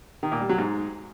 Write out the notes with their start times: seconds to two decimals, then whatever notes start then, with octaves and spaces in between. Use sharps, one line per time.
0.23 D#3
0.32 A#2
0.41 G3
0.49 F#3
0.58 G#2